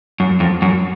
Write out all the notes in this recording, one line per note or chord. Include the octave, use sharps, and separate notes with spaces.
F#2
F2
F#2